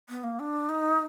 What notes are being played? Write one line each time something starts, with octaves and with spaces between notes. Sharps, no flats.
B3
A#3
D4
D#4